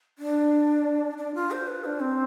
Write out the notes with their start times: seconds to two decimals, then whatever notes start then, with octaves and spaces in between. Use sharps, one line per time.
0.19 D4
1.18 D4
1.35 F4
1.51 C5
1.67 B4
1.85 D4
2.00 C4